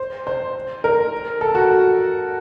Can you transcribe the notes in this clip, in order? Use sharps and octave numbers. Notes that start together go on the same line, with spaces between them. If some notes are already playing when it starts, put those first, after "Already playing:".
Already playing: C5
C5
A#4
A4
F#4